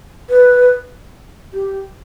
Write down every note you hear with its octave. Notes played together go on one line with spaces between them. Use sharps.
B4
G4